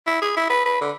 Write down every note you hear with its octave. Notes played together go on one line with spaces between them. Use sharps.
E4
G#4
E4
B4
B4
D3